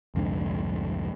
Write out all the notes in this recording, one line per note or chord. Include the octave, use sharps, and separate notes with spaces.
C2 F2 G#2 D3